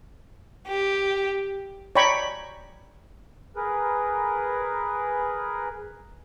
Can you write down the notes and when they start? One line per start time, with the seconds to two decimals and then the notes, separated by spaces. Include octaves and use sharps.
0.68 G4
1.95 C#5 D5 G5 A#5 B5 C#6
3.56 G#4 A#4 B4